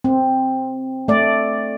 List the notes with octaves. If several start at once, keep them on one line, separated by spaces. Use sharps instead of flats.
C4
A3 D5